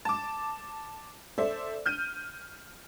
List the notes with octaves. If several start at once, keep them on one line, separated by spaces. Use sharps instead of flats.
A5 D6
A4 C5 D5 E5
F6 G6 D#7